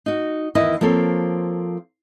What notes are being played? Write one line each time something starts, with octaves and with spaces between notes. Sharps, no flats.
D#4 F#4
E2 D#3 E4 D#5
F3 A#3 C4 A4 C#5